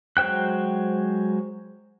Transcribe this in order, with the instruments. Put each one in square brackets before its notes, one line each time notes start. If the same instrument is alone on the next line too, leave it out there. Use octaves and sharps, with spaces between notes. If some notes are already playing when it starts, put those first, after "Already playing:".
[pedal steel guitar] F#3 G#3 C5 G5 F#6